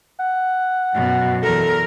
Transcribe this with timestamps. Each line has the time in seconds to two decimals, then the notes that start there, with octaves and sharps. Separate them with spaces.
0.20 F#5
0.94 F#2 B2
1.43 E2 A4 A#4